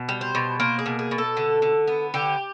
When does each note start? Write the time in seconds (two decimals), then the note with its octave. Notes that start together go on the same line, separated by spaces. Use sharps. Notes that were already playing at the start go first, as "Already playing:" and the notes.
Already playing: B2
0.09 G3
0.21 C5
0.35 B2
0.60 A#3 C5
0.79 G#4
0.86 B2
0.99 G#4
1.11 B2
1.18 A4
1.37 D3
1.62 D3
1.87 B3
2.14 D3 G4